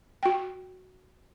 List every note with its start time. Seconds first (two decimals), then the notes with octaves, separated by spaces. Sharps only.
0.23 F#4 G5